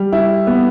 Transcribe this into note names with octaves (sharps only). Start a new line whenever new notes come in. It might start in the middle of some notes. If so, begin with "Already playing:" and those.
Already playing: G3
E4
B3